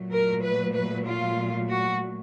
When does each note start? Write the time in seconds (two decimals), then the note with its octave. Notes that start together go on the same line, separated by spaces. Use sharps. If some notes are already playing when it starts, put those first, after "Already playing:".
Already playing: A#2 F#3 A3
0.12 A#4
0.43 B4
0.74 B4
1.06 F4
1.70 F#4